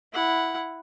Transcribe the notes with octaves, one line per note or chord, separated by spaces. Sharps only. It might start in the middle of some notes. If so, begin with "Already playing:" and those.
E4 F#5